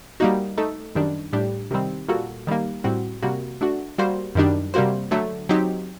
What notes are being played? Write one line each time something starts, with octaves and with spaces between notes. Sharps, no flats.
G3 A#3 D#4 F#4
A3 D#4 A4
F#2 D#3 G3 D4
A2 G3 D4 G4
C3 D#3 G3 C4
A#2 G3 A#3 F#4 A4
D#3 G3 A#3
A2 G3 C4 F#4
C3 G3 A#3 F#4
A3 D4 F#4
G3 A#3 F#4 C5
F#2 D#3 G3 D4
C3 G3 A#3 F#4 C5
D3 F#3 A3
F#3 C4 D#4 G4